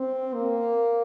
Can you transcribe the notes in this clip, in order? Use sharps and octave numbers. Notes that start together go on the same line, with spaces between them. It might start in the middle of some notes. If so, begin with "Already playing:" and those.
Already playing: C4
A#3